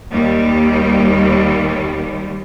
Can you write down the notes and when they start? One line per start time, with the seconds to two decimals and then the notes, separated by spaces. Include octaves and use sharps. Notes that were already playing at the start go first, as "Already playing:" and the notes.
0.12 D#2 G3